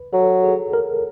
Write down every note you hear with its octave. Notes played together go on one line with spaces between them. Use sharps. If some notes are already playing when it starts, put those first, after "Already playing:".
Already playing: B4
F#3 A4
G#4
A#4